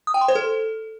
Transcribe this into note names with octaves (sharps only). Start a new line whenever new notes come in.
D#6
G5
C6
C5
A4